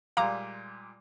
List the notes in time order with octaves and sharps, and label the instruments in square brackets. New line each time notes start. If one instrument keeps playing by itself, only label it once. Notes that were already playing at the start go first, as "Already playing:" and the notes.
[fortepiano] A#2 G3 G#3 [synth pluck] F5 A#5 D6